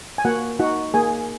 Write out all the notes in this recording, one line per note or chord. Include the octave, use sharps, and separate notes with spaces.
G#5
A#3 F#4 F#5
D#4 F#4 F#5
A#3 G#4 G#5